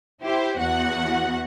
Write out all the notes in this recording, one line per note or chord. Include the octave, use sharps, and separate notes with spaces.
E4 G4 C5
E2 F#4 F#5